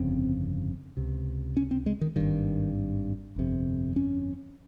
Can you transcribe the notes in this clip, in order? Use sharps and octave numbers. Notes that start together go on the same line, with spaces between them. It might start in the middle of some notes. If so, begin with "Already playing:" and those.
Already playing: G1 F2 C#3 C4
C#2 C3
C#4
C4
G#3
D#3
G#1 G2 D#3
G1 F2 C3
C#4